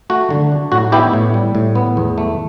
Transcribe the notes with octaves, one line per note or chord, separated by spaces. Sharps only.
A3 F#4
D3
D4
A2 F#4
B3 E4 G4
A2
G3
A2
B3
E2
A3